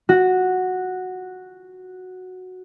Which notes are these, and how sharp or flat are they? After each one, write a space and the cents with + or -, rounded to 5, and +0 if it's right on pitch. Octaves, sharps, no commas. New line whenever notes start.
F#4 -5